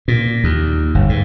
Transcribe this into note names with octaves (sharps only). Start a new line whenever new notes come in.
A#2
D#2
G1
G#2